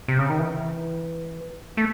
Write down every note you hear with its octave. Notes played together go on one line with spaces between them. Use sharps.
C3
C#3
D#3
E3
A3